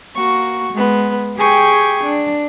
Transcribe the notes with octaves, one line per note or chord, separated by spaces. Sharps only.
A#3 F#4 C#6
G#3 B3
G4 G#4 G5 G#5 C#6
D4